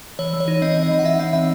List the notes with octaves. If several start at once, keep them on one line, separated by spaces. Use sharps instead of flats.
E3 C#5
E3
C#5
D#4
C4 D#5
E3
D#5
E3
F#5
D#4 E5
C4 E5
E3 E5